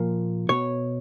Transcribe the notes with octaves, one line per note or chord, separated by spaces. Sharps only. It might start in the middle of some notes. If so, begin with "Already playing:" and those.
Already playing: A#2 F3 A#3
B2 C#5